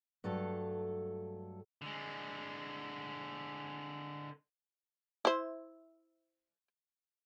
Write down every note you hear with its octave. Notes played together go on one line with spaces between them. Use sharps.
G2 F#3 A3 A4
D3 G#3
E4 C5